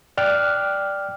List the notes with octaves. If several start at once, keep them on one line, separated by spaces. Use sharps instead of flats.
D5 G5 D6 F6 F#6